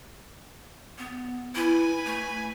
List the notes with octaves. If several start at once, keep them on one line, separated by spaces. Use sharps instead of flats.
B3
E4 B4 G#5
A3